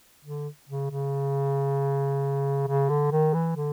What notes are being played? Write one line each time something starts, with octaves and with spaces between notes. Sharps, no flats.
D3
C#3
C#3
C#3
D3
D#3
E3
D3